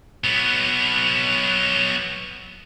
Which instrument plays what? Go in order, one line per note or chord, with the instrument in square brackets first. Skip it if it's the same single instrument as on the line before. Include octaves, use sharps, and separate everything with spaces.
[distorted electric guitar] F#3 B3